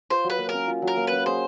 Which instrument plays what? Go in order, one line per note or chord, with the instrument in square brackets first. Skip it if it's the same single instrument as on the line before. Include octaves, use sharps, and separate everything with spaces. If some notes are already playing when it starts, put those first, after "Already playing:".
[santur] F4 [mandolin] C5
[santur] F#3
[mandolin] B4
[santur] A#3
[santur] C#4 [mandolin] A#4
[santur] F4
F#3
[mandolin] A#4
[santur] A#3
[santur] C#4 [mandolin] B4
[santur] G#4 [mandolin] C5